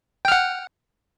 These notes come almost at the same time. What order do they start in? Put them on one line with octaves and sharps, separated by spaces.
G5 F6 F#5